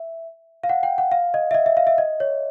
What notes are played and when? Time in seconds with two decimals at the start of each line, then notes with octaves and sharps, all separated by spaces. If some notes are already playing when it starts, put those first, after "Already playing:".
Already playing: E5
0.63 F5
0.69 F#5
0.83 G5
0.98 F#5
1.12 F5
1.34 D#5
1.51 E5
1.54 D#5
1.66 E5
1.77 F5
1.87 E5
1.98 D#5
2.20 C#5